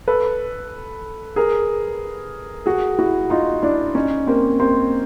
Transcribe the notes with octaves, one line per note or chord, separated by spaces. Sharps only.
A4 B4
G#4 A#4
F#4 G#4
E4 F#4
D#4 F4
D4 E4
C#4 D#4
A#3 C4
A#3 C4